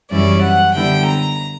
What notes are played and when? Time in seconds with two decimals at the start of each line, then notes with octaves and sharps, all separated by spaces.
0.10 F#2 E3 G3 C#4 E4 D5
0.42 F#5
0.74 D3 G3 B3 E4 G5
1.06 A#5